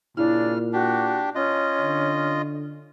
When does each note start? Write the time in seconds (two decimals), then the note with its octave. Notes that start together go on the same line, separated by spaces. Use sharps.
0.17 A#2 C#3 D4 E4 F6
0.73 D4 F#4 G4
1.35 C#4 F4 D#5
1.81 D3